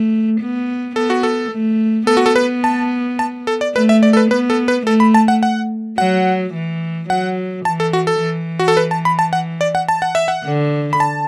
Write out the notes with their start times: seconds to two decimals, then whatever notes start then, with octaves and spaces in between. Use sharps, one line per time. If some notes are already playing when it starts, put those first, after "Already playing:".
Already playing: A3
0.40 B3
0.96 B3 A4
1.10 F#4
1.23 A4
1.52 A3
2.07 B3 A4
2.17 F#4
2.26 A4
2.36 B4
2.64 A5
3.19 A5
3.47 A4
3.61 D5
3.75 A3 B4
3.89 E5
4.03 D5
4.13 A4
4.17 B4
4.31 B3 B4
4.50 A4
4.68 B4
4.86 A3 A4
5.00 B5
5.14 A5
5.28 F#5
5.43 F#5
5.98 F#3 F#5
6.54 E3
7.09 F#3 F#5
7.65 E3 A5
7.80 A4
7.93 F#4
8.07 A4
8.21 E3
8.59 F#4
8.68 A4
8.77 B4
8.91 A5
9.05 B5
9.19 A5
9.33 F#5
9.61 D5
9.75 F#5
9.88 A5
10.02 F#5
10.15 E5
10.28 F#5
10.44 D3
10.93 B5
11.00 A5